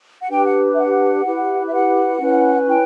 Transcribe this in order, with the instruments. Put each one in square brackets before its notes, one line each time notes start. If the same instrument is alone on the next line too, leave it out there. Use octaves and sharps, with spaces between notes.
[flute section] F#5
D4 G4 B4 G5
F#5
E5
F#5
E4 G4 B4
E5
F#5
C#4 E4 B4
G5